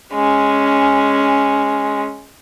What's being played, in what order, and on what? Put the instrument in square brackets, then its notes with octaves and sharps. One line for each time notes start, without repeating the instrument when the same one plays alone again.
[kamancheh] G#3 C#4